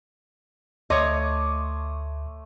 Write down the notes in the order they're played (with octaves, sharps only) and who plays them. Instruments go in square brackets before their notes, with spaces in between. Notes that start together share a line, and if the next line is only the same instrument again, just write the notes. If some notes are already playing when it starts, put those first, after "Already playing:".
[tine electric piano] D2 [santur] A3 C6 D6 [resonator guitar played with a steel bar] C#5 D#5